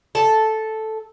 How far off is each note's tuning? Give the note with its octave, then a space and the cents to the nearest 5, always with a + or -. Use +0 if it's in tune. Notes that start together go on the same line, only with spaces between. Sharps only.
A4 -5